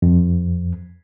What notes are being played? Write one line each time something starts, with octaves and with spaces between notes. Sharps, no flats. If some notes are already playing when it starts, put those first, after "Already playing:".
F2